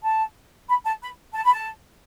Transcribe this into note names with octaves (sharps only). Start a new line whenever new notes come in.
A5
B5
A5
B5
A5
B5
A5